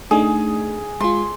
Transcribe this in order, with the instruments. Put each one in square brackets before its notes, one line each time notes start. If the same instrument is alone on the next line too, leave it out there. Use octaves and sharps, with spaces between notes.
[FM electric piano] A3 D4 D#4 [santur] G#4
[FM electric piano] G#3 F4 [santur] C6